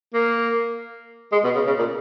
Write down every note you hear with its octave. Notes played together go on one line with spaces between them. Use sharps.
A#3
G#3
B2
C#3
C#3
A#2